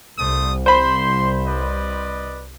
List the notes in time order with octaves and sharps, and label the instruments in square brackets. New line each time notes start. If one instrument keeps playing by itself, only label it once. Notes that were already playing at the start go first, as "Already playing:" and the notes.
[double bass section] C2 [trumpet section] A3 C5 D#6
[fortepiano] C5 B5 [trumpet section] C6
[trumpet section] B4 D5 D#5